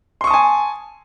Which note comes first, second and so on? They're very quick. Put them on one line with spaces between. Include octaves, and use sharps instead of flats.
C6 C#6 D#6 A5 G#5